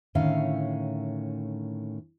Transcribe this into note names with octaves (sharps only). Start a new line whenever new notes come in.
A2 D3 D#3 C#4 E5 F5